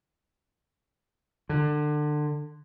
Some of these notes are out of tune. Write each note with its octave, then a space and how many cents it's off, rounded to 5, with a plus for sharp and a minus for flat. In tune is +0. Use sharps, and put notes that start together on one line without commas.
D3 +25